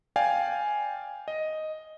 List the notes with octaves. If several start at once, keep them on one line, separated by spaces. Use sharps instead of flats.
D5 F5 G5 G#5
D#5